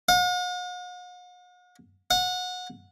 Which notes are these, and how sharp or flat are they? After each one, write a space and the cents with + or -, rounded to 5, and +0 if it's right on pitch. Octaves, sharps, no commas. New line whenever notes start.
F#5 -45
F#5 -25